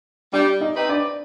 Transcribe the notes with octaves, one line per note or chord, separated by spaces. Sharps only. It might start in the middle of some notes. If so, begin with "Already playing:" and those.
G3 D4 D5
D#4 D#5
C4 D#4 B4
D4 D5